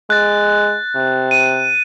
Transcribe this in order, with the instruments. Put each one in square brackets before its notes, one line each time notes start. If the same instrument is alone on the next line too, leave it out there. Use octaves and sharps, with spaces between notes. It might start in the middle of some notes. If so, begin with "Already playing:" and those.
[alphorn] G#3 [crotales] F#6 A6
[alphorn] C3
[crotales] D#7